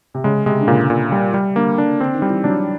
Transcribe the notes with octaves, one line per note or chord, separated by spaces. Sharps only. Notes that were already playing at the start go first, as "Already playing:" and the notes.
C3
C#3 G#3
C3 G#3
D3
A#2 C#3
A#2
G3
G3
D3 A#3
D4
D3 C4
D#3
G3
E3
F#3 D4